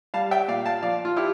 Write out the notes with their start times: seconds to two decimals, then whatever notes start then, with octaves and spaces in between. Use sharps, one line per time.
0.14 G3 F5 A5
0.31 E5 G5
0.48 A#2 D5 F5
0.65 F5 A5
0.82 F3 D5 F5
1.05 F4
1.16 E4 G4